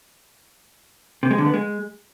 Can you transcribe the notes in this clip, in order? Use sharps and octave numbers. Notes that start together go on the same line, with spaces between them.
C3
G#3
D3
B3
G#3